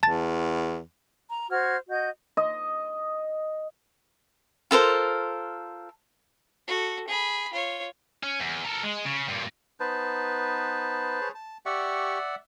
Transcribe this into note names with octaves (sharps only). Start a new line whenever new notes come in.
E2 A5 A6
A#5
F#4 C5 F6 G#6
F#4 D#5 G6
D#5
F4 A4 A#4 C5
F#4 A4
G#4 B5
F4 C#5
C#4
E2
A4 A#4
G#3
C#3
G2 A#2
B3 D#4 B4 C5 A5
G#4 C#5
A5
G4 D5 E5 F#5 C#6